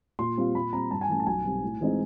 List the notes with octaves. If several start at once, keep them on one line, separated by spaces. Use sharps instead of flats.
A#2 C6
G3 C4 F4
A#2 B5
G3 C4 A#5
G2 A5
G#5
E3 A3 C#4 A5
A5
B1 G#5
B2 G3 C4
A2
E3 G#3 C4 D#4